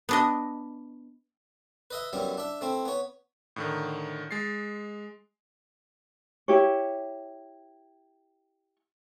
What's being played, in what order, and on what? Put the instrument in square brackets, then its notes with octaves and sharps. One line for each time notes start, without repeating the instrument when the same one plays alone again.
[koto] B3 D4 D#5
[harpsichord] B4 D#5 E5
F#2 G3 B3 E4
D4 E5
A3 C4 E4
B3 C#5
[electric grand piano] A2 D3 D#3
G#3 A6 C7
[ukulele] E4 G4 C#5